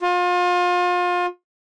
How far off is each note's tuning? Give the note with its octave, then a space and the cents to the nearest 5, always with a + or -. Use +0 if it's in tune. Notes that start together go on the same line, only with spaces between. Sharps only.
F4 +35